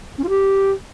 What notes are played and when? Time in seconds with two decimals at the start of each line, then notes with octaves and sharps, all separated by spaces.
0.18 C#4
0.23 F4
0.29 G4